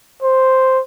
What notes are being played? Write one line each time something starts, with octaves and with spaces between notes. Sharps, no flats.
C5